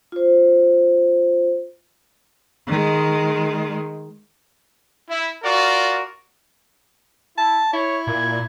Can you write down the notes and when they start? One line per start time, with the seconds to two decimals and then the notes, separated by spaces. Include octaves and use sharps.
0.12 F4 C5
2.67 D#3 G#3
5.10 E4
5.43 F4 F#4 A#4 D5
7.38 E4 A5
7.73 E4 C#5
8.07 A#2 G#6